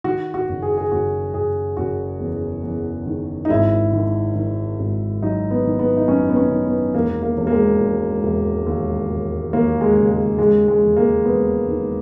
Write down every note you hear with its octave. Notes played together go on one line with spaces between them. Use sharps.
D#3 F#4
F#4
F#1
G#4
G#4
F#1 F#4
F#1 G#4
F#1 F#4
E2
E2
D#3
D#4
G#1 E4
D#3
D#3
G#1
F#3 D#4
B3
D#3
B3
D#4
F#2 C#4
B3
C#4
D#3
B3
E1 A#3
A#3
E1
A#3
G#3
E1
E1
D#2
E1
D#2 A#3
G#3
C#3
G#3
D#2 G#3
G#3
E1
A#3
E1 B3
D#3